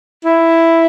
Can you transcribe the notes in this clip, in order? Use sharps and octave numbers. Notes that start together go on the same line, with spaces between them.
E4